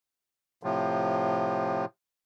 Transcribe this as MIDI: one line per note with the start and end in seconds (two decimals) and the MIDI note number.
0.63 1.85 45
0.63 1.85 48
0.63 1.85 53